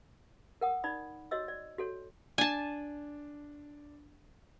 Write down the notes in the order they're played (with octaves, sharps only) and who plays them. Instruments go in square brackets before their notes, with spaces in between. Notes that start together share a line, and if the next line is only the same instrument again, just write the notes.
[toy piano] A#4 F#5 D#6
D#4 D5 B5 D#6
F#4 C#5 D#5 E6
D5
F#4 A4 C#5
[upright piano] D4 [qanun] G#5 A5